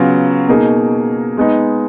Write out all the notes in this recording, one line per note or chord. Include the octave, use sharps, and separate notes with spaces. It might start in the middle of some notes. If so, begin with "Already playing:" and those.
Already playing: C#3 F#3 B3 F4
B2 A#3 D#4 G#4
G#3 B3 D#4